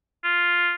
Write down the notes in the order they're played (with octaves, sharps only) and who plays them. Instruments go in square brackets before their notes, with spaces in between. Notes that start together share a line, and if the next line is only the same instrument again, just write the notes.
[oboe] F4